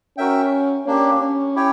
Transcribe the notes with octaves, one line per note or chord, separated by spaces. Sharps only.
C#4 F#4 A#4 E5 G5
A#3 C#4 D4 G4
C#4
E4 G4 C#5 G5